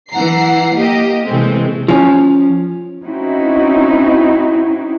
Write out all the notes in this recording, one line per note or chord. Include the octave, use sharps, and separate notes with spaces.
E3 F#5 A#5 C7
A#3 G4 D#5
C3 E3 G#3 A3 C4
F3 C#4
C4 C#4 D#4 E4 F#4